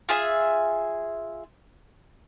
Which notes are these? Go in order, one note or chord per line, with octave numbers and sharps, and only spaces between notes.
F4 G#4 E5